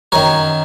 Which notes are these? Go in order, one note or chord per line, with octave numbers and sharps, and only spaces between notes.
F#2 D#3 F#3 A#4 C#5